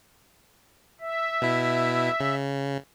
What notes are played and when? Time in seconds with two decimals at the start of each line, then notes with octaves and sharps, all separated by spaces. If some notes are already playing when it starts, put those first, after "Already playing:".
1.01 E5
1.42 B2 E4
2.20 C#3